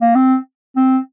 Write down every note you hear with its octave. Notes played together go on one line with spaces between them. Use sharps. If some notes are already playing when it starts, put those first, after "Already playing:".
A#3
C4
C4